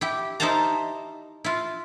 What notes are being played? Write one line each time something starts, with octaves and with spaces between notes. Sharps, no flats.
E4 G4
D#4 E4 C5 F5 A5 A#5
E4 F4